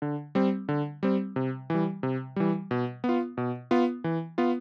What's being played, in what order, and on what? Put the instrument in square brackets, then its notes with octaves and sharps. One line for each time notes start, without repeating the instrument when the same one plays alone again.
[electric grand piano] D3
G3 C4
D3
G3 C4
C3
E3 G3
C3
E3 G3
B2
B3
F4
B2
B3 F4
E3
B3 F4